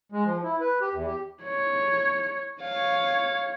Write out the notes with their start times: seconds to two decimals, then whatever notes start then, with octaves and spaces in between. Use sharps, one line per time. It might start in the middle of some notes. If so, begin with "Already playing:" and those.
0.12 G#3
0.25 F3
0.44 E4
0.61 B4
0.81 G4
0.94 E2
1.07 G4
1.44 C#5
2.62 C#5 F5